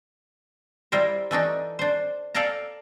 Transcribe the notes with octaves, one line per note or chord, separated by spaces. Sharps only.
G3 E4 A#4 C5
E3 A3 D4 D#4
D4 C5
A4 D5 F5 G5 A5 A#5